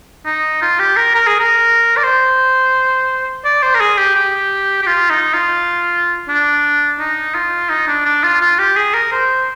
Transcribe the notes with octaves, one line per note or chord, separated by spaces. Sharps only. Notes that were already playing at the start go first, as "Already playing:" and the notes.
D#4
F4
G4
A#4
A#4
G#4
A#4
D5
C5
D5
C5
A#4
G#4
G4
G4
G4
F4
D#4
F4
D4
D#4
F4
D#4
D4
D4
F4
F4
G4
G#4
A#4
C5